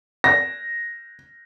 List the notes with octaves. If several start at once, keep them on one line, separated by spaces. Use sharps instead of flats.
A#6